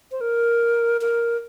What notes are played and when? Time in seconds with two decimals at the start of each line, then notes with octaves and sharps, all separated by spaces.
0.12 C5
0.21 A#4
1.01 A#4